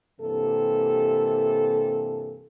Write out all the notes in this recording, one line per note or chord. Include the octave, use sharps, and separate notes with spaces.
G2 C3 E3 A#3 A4